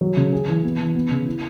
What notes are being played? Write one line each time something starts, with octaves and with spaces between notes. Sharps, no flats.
F#3
C#3
G#4
E3
B3
E3
B3
C#3
E4